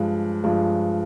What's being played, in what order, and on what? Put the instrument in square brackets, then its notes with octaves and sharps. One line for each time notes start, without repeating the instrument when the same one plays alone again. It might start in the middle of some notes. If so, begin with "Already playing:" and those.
Already playing: [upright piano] G2 F3 G#3
G2 F3 G#3